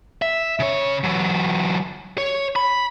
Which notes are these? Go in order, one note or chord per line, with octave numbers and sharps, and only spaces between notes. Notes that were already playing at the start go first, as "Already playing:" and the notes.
E5
C#3 C#5
E3 F#3
C#5
B5